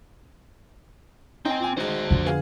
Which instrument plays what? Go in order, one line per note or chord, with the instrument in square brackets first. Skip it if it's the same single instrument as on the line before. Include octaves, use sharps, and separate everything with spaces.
[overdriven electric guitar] C4 G5 [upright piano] D#4 G#5
[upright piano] A#2 G#5
[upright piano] D#3 G#3 [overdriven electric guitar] F#4 C5
[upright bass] F2 D3
[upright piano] B3 G#4 F5